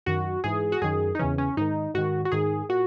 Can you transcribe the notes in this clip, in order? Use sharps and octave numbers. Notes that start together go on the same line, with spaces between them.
F#2 D#3 F#4
G#2 E3 G#4
F#4
F#2 D#3 G#4
D#4
E2 C#3 E3 C#4
C#4
G#2 D#3 D#4
G#2 D#3 F#4
F#4
G#2 D#3 G#4
A#2 F#4